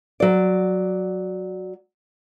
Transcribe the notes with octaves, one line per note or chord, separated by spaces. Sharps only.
F#3 D5